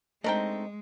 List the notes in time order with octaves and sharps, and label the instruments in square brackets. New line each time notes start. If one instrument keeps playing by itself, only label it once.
[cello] G#3 [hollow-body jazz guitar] A3 C4 D#4 [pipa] D4 A#4 G5 [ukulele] D#5